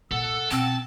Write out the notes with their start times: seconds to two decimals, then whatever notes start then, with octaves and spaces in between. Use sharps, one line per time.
0.12 A#2 A#3 A4 F#5 E6
0.51 B2 C4 A5